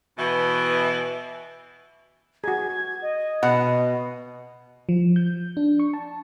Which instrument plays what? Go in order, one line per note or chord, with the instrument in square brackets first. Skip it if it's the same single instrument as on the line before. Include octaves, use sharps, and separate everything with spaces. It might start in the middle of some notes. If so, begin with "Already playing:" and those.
[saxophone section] B2 E3
[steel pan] F#4 G#4 [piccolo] G#6
[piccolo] D#5
[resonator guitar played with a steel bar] B2 [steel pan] F#5
[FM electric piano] F3
G6
D4
C#6
A5